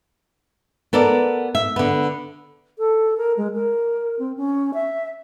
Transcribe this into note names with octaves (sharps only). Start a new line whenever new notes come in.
B3 A4 A#4 D5
E5
D3 B3
A4
A#4
G#3
A#4
C4
C#4
E5